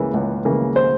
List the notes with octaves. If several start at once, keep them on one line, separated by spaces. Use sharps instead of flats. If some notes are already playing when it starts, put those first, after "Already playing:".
Already playing: C#2 C#3 E3 A#3
C#2
C#3 E3 A#3
C5